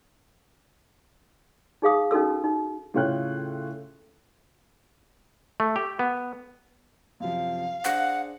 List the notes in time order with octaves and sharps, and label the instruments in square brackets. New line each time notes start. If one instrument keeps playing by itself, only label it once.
[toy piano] D#4 G#4 F5 D#6
C#4 D#4 F#4 A4 E6
D#4
[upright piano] A2 C#3 F4 C#5 G5 F#6
[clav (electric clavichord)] A3
G4
B3
[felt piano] F#2 C3 F3 [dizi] F5
[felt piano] D4 G#4 C5 [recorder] F#5